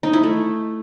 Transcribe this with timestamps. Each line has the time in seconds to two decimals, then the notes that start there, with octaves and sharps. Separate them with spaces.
0.03 D#4
0.13 E4
0.23 A3